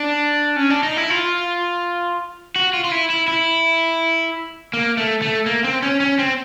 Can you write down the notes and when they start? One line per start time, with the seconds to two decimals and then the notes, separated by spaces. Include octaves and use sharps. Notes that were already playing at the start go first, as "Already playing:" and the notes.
Already playing: D4
0.56 C#4
0.70 D4
0.83 D#4
0.97 E4
1.10 F4
2.56 F#4
2.73 F4
2.84 F4
2.92 E4
3.10 E4
3.28 E4
4.73 A#3
4.97 A3
5.22 A3
5.46 A#3
5.64 C4
5.83 C#4
6.00 C#4
6.19 C4